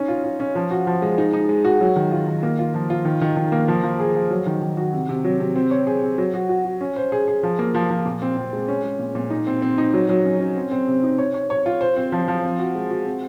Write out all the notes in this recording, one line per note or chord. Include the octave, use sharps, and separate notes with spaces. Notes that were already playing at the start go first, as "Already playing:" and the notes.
Already playing: C#4 D#4
F4
F4
C#4
F3
F#4
F3
G#3
D#4
D#4
G#3
F#4
F#3
D#3
F4
D#3
A#3
F4
F3
F4
D#3
D#3
D#3
A#3
F3
F3
G#4
F3
F#3
D#3
D#3
F#4
C3
C3
F#3
C3
C4
C#5
G#4
C4
F#3
F#4
F#4
F#4
C#4
C5
G#4
G#4
F3
A#3
F3
F3
A#2
C4
C4
G#3
C#4
G#3
A#2
A#2
D#4
C4
C4
D#4
F#3
F#3
C#4
C#4
C4
C4
C3
D#4
C#5
C#5
C#5
F4
C5
C4
F3
F3
C4
F#4
G#3
F#4
C4